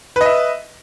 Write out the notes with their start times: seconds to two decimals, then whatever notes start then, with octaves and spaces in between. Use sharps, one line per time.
0.16 B4
0.21 D#5
0.26 E5